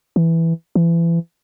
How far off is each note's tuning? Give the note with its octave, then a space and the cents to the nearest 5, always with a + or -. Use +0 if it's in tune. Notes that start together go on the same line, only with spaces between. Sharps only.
E3 +0
E3 +30